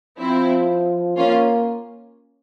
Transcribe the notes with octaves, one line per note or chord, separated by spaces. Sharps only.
F3 C4 E4
A#3 C#4 F4